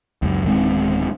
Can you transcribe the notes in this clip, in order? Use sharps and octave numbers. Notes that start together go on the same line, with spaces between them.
C#2 F#2
D1 D#3 G#3 C4